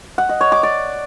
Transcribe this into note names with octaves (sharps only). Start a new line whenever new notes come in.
F#5
D#5
C#5
D6
D5